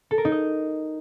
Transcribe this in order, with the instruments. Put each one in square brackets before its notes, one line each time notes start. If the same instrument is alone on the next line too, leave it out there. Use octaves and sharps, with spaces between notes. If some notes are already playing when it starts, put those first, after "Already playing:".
[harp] A4
A#4
D#4
D#5